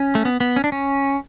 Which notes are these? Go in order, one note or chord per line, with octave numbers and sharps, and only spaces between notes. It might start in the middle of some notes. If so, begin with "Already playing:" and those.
Already playing: C#4
A3
B3
B3
C#4
D4
C#4